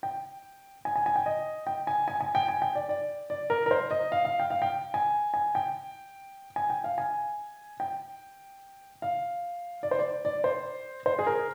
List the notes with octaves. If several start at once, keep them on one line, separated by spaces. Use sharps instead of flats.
G5
G#5
G#5
G#5
G5
D#5
G5
G#5
G#5
G#5
G5
G#5
G5
D5
D5
D5
A#4
A#4
C5
D#5
F5
F5
G5
F5
G5
G#5
G#5
G5
G#5
G5
F5
G#5
G5
F5
D5
C5
D5
D5
C5
C5
G#4
A#4